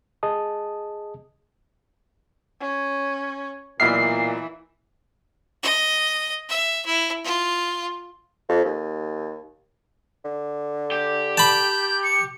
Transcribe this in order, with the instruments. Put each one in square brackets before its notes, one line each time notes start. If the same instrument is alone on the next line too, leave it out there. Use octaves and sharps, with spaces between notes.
[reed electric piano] G#4 D#5 A5 D#6
[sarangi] C#4
[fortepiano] B1 E5 F6 [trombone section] A#2 [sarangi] E3 [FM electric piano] C7
[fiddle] D#5
E5
E4
F4
[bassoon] F2
D#2
D3
[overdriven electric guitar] G4
[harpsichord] A5 B5 [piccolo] G6
[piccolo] C#7